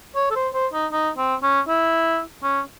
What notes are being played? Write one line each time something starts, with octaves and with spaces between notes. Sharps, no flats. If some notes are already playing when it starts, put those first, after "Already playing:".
C#5
A4
C5
C5
D#4
D#4
C4
C#4
E4
C#4